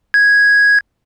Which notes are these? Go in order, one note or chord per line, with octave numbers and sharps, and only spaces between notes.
G#6